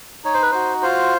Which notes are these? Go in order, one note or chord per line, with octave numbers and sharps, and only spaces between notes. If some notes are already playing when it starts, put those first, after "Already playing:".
D#4 C#5
C5
B4
F#4 C5
F4 C5